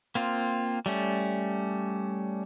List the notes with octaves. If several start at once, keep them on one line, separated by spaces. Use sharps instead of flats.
A#3 C4 F4
G3 A3 C#4